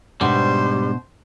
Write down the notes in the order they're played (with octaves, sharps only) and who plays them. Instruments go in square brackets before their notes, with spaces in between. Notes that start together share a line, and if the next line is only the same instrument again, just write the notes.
[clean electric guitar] G#2 D4 [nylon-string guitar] B2 E5 [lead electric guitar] G3 [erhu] C5